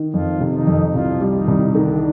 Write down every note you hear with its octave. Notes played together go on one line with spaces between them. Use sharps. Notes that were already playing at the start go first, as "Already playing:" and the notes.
Already playing: D#3
F2 F3 F4
C3
D#3 D#4
F2
C2 F3 F4
G3
D#3 D#4
C2
D3 D#3 D4